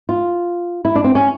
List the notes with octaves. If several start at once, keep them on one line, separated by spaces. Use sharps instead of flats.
F4
E4
D4
C4
C#4